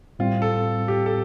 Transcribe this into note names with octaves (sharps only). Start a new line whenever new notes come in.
A2 G3 C4 F4
A4
G4
A4